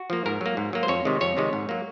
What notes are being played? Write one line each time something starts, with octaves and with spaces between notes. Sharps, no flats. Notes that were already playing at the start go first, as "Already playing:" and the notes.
Already playing: F#4
F3 A#3
G#2 A#4
F#3 A#3
G#2
F#3 A#3
C5
F2 C#5
C3 D#3 G#3
F2 C#5
C3 D#3 G#3
G#2
F#3 A#3